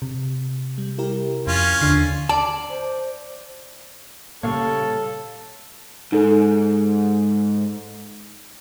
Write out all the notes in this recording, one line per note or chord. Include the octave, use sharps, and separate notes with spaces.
C3
G3
E4 G4 A#4
F2 C#4 F4
D#2 D3 D4 C7
D5 A5
C5
A#2 C#3 G3 A#3 A4 C#5 F5 C#6
G#2 D#4 A4